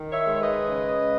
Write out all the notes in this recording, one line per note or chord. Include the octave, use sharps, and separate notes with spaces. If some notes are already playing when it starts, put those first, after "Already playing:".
Already playing: D#3
C#5 E5
G#3
C#5
B4 D#5
C#3